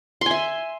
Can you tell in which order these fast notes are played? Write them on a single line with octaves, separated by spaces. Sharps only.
C6 G#5 E5